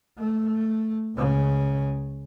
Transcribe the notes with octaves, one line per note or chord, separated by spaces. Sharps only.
A3
C#2 C#3